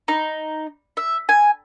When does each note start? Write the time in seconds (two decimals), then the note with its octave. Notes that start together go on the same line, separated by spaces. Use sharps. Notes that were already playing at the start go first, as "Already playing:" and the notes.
0.08 D#4
0.97 E5
1.29 G#5